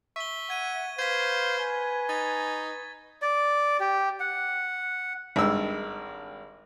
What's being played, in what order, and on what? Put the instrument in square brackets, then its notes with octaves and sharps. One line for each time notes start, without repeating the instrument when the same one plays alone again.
[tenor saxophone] E5 [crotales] C#6 G7
[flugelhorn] F#5 [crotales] G#6 D#7
[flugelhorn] B4 [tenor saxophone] C5 [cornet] F5 [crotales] G#6 B6
[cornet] G#5
[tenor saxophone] D#4 [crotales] A6
[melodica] D5
G4
F#5
[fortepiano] G#1 G2 E6